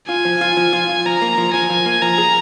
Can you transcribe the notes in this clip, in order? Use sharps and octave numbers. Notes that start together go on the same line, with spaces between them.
F4 G#5
F3
F4
F3
F4
F4
F3 A#5
A#3
F3
F3 G#5
F3
A#3
F3 A#5
G#4